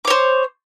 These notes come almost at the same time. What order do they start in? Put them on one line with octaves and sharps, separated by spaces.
D6 C#5 C5